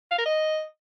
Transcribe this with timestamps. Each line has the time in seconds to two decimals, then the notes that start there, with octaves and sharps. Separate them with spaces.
0.11 F5
0.18 A#4
0.26 D#5